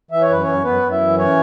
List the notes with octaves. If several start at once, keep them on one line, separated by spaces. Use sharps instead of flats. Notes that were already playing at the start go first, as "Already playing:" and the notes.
E3 E5
C#5
F#2 B4
F#2 C#4 C#5
F#2 B3 B4
F#2
E4 E5
E3
C#4 C#5